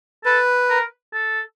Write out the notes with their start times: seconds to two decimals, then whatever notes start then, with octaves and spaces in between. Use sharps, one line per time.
0.25 A4 B4
0.70 A#4
1.14 A4